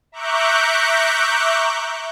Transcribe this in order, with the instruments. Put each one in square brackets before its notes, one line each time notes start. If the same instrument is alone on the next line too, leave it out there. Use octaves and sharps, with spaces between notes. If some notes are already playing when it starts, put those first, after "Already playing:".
[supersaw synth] E5 A#5 C#6 D6 F#6 G6